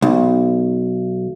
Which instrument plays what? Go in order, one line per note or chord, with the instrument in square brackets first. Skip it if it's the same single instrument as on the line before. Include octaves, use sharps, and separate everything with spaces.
[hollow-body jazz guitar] B1